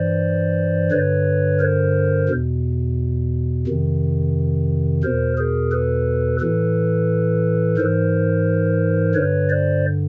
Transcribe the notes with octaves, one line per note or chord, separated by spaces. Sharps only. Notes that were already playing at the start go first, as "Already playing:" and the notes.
Already playing: G2 E3 C5 D5
G2 D3 B4 C#5
A#4 C5
E2 B2
F2 C3 D#3
E2 B2 A#4 C5
G#4 A#4
A4 B4
A2 E3 A4 B4
G#2 E3 A#4 C5
G2 D3 B4 C#5
C5 D5